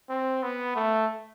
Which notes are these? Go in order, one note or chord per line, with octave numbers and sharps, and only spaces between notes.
C4
B3
A3